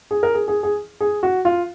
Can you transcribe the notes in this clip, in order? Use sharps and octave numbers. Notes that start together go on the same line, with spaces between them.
G#4
A#4
G#4
G#4
G#4
G#4
F#4
F4